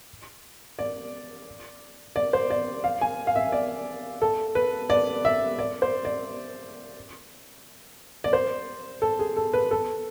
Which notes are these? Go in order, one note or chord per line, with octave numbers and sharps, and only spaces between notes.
D5
D5
C5
D5
F5
G#5
F5
E5
D5
A4
B4
D5
E5
D5
C5
D5
D5
C5
A4
G#4
A4
B4
A4